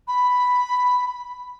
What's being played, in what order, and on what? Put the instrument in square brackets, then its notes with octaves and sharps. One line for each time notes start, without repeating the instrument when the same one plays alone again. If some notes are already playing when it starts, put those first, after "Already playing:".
[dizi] B5